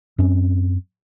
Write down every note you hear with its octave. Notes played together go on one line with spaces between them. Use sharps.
F#2 C4 C#4